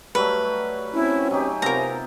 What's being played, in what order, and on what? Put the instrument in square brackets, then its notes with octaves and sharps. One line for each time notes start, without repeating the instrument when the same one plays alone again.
[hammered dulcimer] F#3 G3 A3 [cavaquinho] B4
[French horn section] C4 C#4 [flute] E4
[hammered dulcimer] F#3 D#4 G4 [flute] G#5
[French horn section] C3 [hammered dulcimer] B3 C4 F4 [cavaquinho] A#4 A#5